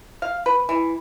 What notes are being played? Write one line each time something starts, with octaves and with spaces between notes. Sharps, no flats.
F5
B4
E3